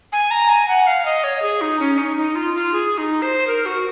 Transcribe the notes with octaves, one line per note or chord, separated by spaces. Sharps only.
G#5
A#5
G#5
F#5
F5
D#5
C#5
G#4
D#4
C#4
D#4
D#4
F4
F4
G#4
D#4
C5
A#4
F#4